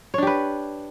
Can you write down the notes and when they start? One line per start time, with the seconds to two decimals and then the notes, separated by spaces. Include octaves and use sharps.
0.14 C#5
0.18 D4
0.23 G4
0.27 B4